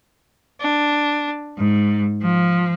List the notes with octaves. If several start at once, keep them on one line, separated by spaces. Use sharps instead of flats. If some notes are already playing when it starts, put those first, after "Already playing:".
D4
G#2
F3